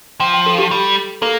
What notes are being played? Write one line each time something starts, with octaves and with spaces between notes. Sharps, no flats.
F3 G5
G5
A4
G4
G3
A#3 A4